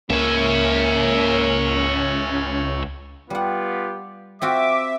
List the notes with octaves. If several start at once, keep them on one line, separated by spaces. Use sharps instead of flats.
C#2 A#3 C#4 C#5 E5
G3 B3 F4 G4 F#5
C4 F4 F#4 E5 D6